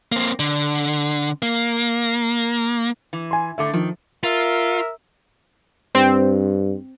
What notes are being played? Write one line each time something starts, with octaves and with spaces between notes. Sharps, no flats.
A#3 C4
D3
A#3
E3
G#5 C6
A2 D3 A3 E5 D6
D#3 F3
F4 A#4 E5
G2 C4